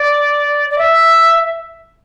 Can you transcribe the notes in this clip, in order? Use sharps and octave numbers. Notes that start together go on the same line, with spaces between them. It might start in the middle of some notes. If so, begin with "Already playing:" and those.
Already playing: D5
D5
E5